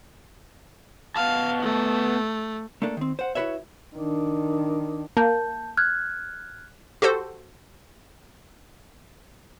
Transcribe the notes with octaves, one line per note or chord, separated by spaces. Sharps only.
B3 F5 A5
A3
A3 A#3 D4 A4
D#3 C4
C5 F#5
E4 F#4 G#4 B4 C#5 E5
D#3 D4
A#3 A5 G6
F6 F#6 G#6
F#4 G4 A4 C5